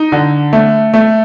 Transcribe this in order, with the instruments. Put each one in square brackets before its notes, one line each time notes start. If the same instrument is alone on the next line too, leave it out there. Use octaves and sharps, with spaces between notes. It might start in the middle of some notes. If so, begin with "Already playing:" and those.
Already playing: [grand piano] D#4
D3
A3
A3